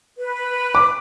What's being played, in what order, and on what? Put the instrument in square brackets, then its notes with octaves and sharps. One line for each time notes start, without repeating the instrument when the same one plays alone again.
[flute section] B4
[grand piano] D6